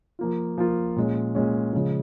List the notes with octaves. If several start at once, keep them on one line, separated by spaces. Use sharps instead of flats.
F3 A#3 F4
F3 A#3 F4
A#2 G#3 C#4
A#2 G#3 C#4
C#3 F3 G#3